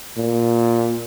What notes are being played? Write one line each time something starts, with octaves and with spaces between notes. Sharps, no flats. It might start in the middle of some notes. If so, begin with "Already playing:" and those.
A#2